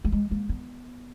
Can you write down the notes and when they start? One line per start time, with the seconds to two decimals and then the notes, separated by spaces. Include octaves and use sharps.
0.05 A3
0.12 G#3
0.31 A#3
0.49 B3